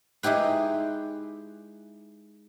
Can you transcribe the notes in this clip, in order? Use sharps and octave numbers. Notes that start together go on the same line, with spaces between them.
G#3 D#4 E4 G4 B4